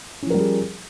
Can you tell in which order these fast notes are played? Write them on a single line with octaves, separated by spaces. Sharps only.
C#4 F3 A#4 G3 G#4